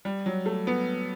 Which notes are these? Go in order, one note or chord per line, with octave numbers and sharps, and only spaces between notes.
G3
F#3
A3
B3